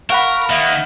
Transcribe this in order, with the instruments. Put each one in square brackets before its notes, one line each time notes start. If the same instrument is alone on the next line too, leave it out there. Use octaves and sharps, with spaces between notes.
[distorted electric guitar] A#4 [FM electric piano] F5 F#5 B5 [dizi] C#6
[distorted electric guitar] D#3 A#3 [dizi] E5